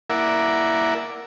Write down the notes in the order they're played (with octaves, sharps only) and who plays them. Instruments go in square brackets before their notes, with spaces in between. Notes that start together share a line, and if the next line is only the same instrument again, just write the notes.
[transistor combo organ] A#3 E4 A#4 D5 E5 F#5